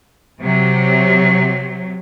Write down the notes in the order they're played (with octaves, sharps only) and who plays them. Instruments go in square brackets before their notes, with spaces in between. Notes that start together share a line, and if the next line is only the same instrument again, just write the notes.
[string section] C3 F#3